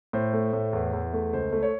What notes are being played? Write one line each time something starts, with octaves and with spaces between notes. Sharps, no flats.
A2 C5
A3
A2
E2
E2
A3
C#2 C5
A3
C#5